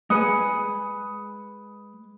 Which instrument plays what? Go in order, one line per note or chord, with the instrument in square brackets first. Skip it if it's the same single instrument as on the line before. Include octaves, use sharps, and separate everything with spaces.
[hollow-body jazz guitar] G#3 B4 G#5 [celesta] B5 F#6 C#7 [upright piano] D#6